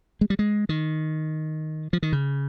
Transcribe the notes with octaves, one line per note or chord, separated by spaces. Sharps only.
G#3
G3
G#3
D#3
F3
D#3
C#3